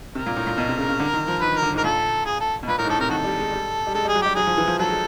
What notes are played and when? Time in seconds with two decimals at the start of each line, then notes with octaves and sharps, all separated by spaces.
0.15 C3 A#4
0.26 A#2
0.36 A2
0.47 A#2
0.58 B2
0.68 C3
0.78 C#3
0.89 C#3
0.99 D3
1.14 D#3
1.28 F3
1.41 D#3 B4
1.52 D#3
1.56 A#4
1.62 D3
1.74 G#2
1.78 A#4
1.84 A#2 A4
2.25 G#4
2.40 A4
2.63 B2
2.68 A#2 B4
2.78 A2 A#4
2.84 G#2
2.89 A2 A4
3.00 C3 A#4
3.10 D#3 F#4 A4
3.24 G3
3.39 G#3
3.52 G3
3.87 G3
3.94 G#3 A4
4.05 G3
4.08 G#4
4.15 F#3
4.22 G3 G4
4.35 F#3 G#4
4.47 F3
4.57 E3
4.68 F3
4.79 F#3 A4
4.89 G#3